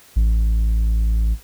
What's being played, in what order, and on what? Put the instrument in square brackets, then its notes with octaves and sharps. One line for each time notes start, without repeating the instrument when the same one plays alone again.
[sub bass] A1